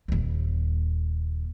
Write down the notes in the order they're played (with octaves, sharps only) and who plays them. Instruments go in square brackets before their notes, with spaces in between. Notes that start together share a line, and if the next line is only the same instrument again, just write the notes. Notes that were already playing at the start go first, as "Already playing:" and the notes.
[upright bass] D#1 D#2